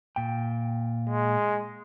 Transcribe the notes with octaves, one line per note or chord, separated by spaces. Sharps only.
A#2 G5
G#3